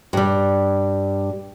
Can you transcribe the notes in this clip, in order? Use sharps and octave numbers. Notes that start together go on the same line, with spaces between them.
G2 G3